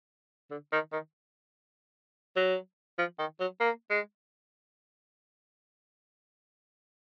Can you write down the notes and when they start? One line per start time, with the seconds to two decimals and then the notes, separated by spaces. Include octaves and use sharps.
0.50 D3
0.72 D#3
0.92 D#3
2.36 F#3
2.98 F3
3.19 D#3
3.40 F#3
3.60 A#3
3.90 G#3